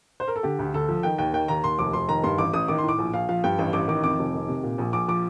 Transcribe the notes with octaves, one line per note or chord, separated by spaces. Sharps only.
C5
A#4
A4
D3 G4
D2
D2 A4
F3
D#3 G5
D#2 G5
D#3 G5
D#2 A#5
D#2 C6
F1 D6
F1 C6
D#3 A#5
G2 C6
A1 D6
A1 D#6
D#3 D6
C6
A2 D6
A#1
A#1 F5
F3 F5
G2 G5
A1
A1 D6
D#3 D6
F2 D6
F1
D#3
C3
A#2
A#1
A#1 D6
F3 D6